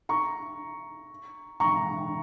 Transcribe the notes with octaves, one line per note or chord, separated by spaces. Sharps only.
A#5 C#6
A#5 C#6